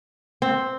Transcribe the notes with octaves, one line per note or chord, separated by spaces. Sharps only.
C4